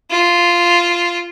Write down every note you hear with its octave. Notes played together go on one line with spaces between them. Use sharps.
F4